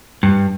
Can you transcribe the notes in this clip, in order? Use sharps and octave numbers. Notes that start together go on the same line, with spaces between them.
G2